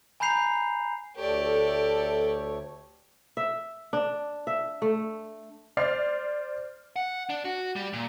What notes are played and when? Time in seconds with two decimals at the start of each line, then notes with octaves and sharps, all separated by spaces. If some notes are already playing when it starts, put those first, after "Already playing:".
0.20 G#5 A#5 B5 G6 C7 F7
1.17 D2 A3 G4 A4 C#5 D5
3.37 E5
3.93 D4
4.47 E5
4.82 A3
5.77 C5 D5 F6 C7
6.96 F#5
7.30 D4
7.45 F#4
7.76 G3
7.93 A#2